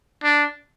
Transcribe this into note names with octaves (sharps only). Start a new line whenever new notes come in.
D4